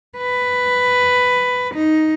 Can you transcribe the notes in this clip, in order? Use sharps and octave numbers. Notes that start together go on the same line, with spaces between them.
B4
D#4